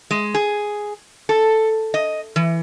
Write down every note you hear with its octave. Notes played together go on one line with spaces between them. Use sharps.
G#3
G#4
A4
D#5
E3